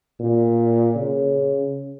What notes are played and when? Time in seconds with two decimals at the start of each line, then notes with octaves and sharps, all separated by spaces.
0.20 A#2
0.95 C#3